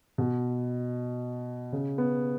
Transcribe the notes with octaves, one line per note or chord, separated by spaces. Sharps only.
B2
C#3
B3